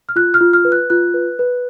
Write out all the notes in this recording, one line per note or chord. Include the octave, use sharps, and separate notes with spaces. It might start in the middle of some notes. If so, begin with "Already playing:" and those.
F6
F4 F#6
F6
F4
F6
B4
F#6
F4 F#6
B4
B4